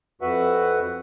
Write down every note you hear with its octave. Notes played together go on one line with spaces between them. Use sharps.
F2 F#4 B4 E5 F#5